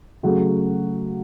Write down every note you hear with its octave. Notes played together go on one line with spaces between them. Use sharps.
C#3 F#3 A3 F#4